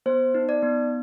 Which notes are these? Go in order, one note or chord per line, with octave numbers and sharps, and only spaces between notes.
B3 C5
D#4
D5
B3